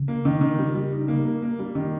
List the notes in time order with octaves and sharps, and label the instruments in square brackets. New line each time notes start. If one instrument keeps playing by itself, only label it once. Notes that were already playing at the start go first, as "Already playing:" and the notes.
Already playing: [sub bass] C#3
[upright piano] A#3
D#3
D#3
G3
G3
D#4
A#3
A#3
A#3
G3
D#3